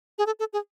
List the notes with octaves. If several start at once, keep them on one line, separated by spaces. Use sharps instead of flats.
G#4
A4
A4
G#4